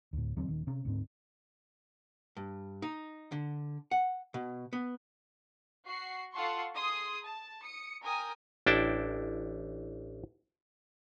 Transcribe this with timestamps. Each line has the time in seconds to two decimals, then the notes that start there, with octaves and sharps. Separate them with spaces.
0.13 D2 A2
0.37 D#2 D3 F#3 C4
0.48 D#1 D#3
0.67 C3 C#4
0.85 D2 G#2 C4
2.37 G2
2.82 D#4
3.32 D3
3.91 F#5
4.34 B2
4.73 B3
5.86 F#4 C7
6.33 F4 A4 F#5 A5 C6 C#6
6.74 G#4 C6 D#6
7.23 A5
7.63 D#6 C#7
8.01 A#4 G5 G#5 D#6
8.66 A1 D4 E4 G5 A5